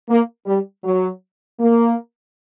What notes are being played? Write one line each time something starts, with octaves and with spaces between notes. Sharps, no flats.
A#3
G3
F#3
A#3